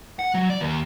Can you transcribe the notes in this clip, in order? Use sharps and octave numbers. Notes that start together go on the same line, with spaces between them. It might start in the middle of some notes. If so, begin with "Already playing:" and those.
F#5
F#3
D5
D#2